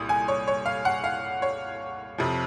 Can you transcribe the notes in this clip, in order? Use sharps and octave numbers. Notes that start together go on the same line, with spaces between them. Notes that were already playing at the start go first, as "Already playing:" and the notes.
Already playing: C2 A#2 D#6
G#5
C#5
C#5
F5
F#5
F5
C#5
F2 C3 F3